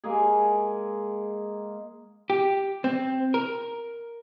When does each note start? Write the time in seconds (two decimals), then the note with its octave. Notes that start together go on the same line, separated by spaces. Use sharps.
0.04 G#3 A#3 G#4
2.30 G4
2.84 C4
3.34 A#4